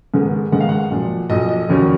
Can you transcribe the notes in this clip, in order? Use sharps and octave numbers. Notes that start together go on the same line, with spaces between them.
G#2 D#3 G#3 B3
G#2 D#3 G#3 B3 F#5
F5
F#5
B1 A#2 F3
B1 A#2 F3 D#5
D#5
F1 D#2 D#3 F#3 C#4